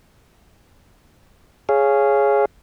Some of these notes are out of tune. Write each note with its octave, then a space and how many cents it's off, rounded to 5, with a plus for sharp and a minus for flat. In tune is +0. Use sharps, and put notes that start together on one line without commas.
G#4 +0 C#5 +0 F5 -15